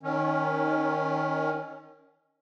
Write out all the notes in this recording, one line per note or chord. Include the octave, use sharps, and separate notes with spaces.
D#3 C#4